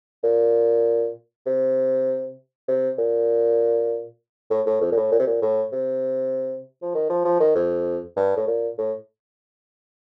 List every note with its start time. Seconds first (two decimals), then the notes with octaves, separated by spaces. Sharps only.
0.24 A#2
1.46 C3
2.68 C3
2.98 A#2
4.50 A2
4.66 A2
4.81 F2
4.92 A#2
4.97 A2
5.12 A#2
5.19 C3
5.27 A#2
5.42 A2
5.72 C3
6.82 F3
6.95 D#3
7.10 F3
7.25 F3
7.41 D#3
7.55 F2
8.16 G2
8.37 A2
8.47 A#2
8.78 A2